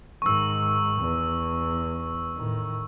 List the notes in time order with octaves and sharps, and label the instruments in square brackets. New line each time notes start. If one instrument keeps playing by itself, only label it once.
[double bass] G#2 D#3 [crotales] C#6 E6
[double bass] E2
A2 D#3